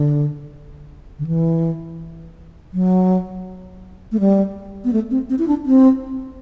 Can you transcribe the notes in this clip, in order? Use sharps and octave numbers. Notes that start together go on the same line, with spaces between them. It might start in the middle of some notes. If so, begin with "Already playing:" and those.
Already playing: D3
D3
E3
F#3
A3
G3
B3
A3
C4
C4
E4
D4
C4